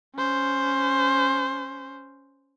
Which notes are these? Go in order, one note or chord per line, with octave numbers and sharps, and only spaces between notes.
C#4 C5